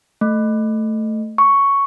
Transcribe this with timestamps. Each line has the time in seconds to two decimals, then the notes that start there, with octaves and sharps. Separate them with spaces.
0.21 A3
1.38 C#6